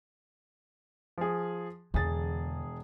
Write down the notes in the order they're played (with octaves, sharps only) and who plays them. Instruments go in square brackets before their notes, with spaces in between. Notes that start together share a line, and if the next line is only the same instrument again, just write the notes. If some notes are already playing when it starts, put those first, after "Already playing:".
[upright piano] F3 G#4
[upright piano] E1 G#4 A6 [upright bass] E2 D3